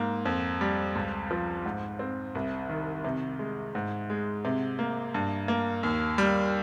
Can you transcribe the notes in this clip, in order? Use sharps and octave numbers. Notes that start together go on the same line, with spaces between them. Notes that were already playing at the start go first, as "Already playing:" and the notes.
Already playing: G#2 A#3
F2
G3
C#2
F3
G#2
C4
C2
D#3
C3
G#3
G#2
G#3
C3
A#3
G2
A#3
D#2
G3